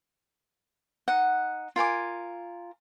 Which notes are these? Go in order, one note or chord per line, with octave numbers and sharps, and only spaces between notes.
D#4 F#5
F4 A#4 G#5 D6